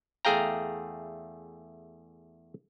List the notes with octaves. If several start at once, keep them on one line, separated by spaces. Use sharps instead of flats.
E2 A3 G#4 F5 G5 A#5